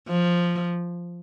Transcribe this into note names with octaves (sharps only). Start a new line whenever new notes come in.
F3